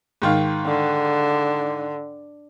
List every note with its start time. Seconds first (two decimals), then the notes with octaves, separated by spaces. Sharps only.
0.22 G#2 D#3 F5
0.65 D3